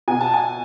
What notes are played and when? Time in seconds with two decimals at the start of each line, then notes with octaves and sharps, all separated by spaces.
0.08 B2 G#5
0.20 A5
0.34 G#5